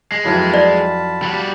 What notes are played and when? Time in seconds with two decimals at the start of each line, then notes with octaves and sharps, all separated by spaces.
0.12 G#3
0.25 F2 E3 F#3 F4 A5 B5
0.54 D5
1.22 G3 F#4